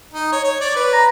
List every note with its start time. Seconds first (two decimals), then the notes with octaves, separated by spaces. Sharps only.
0.14 D#4
0.32 C#5
0.44 C#5
0.61 C#5 D5
0.76 B4
0.93 A#5